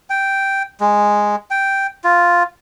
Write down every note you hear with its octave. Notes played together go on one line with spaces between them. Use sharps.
G5
G#3
G5
F4